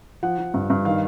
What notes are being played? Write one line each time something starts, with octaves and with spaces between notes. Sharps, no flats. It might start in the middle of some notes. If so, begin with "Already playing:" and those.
F3 F#5
F3
G2
G2
D#3 F5